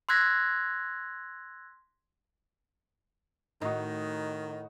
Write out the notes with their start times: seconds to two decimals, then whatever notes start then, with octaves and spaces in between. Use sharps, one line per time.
0.09 C6 E6 F#6 G#6 A#6 B6
3.62 A2 D#3 D#4 F#4